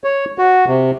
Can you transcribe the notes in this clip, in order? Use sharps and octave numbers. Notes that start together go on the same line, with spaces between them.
C#5
F#4
C3